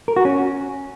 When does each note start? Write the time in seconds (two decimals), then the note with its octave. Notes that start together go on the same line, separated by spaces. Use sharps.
0.08 A#4
0.16 F#4
0.25 C#4